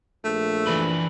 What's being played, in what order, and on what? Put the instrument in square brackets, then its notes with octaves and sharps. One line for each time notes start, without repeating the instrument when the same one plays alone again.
[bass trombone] A#1 [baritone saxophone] A3
[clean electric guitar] E3 D4 B4